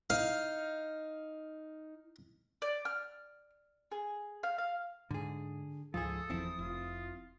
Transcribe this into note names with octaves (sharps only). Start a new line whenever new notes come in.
D#4 F5
D5
F6
G#4
F5
F5
G#2 D3 G#4
C#2 G#2 F3 F4 G#4 A4 D#6
F#1 E2 F3 C4 E4
F1 F4